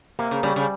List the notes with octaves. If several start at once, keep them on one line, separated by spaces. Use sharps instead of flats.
C3 A#3
C#3
C#3 G3
C#3